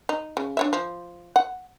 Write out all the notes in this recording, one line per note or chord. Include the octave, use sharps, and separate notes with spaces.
D#4
C#3
D4 C#5 E5
F3
F#5